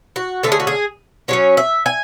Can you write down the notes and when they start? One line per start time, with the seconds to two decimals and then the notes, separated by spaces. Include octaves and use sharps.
0.16 F#4
0.43 D3 A3 C#4 A4
0.52 G#4
0.60 F#4
0.67 G#4
1.28 D3 F#3 C#4 C#5
1.57 E5
1.86 G#5